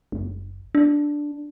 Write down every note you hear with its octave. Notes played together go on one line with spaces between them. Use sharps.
F#1
D4